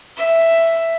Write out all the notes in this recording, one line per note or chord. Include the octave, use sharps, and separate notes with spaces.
E5